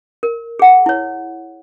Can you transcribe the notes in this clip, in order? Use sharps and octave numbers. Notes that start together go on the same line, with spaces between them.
A#4
G#4 F#5
E4 C#5